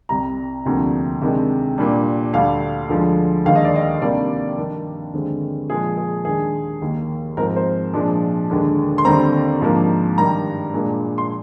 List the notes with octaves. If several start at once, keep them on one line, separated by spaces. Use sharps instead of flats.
C2 C3 G3 A#5
D2 C3 F3 A#3 D4
C3 D#3 G#3 D4
A#2 G3 D4
D2 D3 G3 D4 F5
D2 D3 F3 G#3
D#2 D#3 G#3 D4 F5
D#5
D5
D#5
C3 D#3 G3 A#3 D4 D5
G2 D#3 A#3 D4
D#2 D3 G#3 C4
A#2 F3 G#3 G#4
G#4
D#2 D#3 G#3 D4 G#4
D#2 D#3 A#3
G#2 F3 C4 A#4
C5
A#2 F3 G#3 D4
D#2 D3 G#3 D4
C6
D#2 D3 G3 C4 A#5
G#2 F3 A#3 D4
G2 D#3 G3 A#5
A#2 G#3 D4
C6